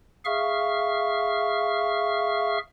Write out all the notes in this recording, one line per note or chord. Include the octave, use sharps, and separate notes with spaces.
G#4 E5 F5 C#6 F6